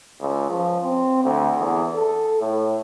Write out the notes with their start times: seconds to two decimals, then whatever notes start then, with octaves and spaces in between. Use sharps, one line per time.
0.21 C#2
0.50 F3
0.84 C4
1.24 D2
1.60 E2
1.95 A4
2.41 A2